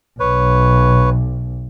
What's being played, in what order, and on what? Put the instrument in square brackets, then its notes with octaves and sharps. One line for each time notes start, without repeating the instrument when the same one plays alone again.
[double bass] B1 [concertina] B4 C#5